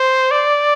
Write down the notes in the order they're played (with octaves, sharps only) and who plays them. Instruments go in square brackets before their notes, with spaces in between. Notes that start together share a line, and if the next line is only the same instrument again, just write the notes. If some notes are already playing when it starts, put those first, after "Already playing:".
Already playing: [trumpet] C5
D5